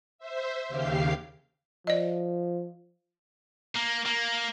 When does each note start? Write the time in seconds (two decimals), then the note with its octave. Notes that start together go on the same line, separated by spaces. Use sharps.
0.18 C5 E5
0.68 D#2 C#3 G4 F5 C7
1.87 F3 D5 D#5
3.75 A#3
4.06 A#3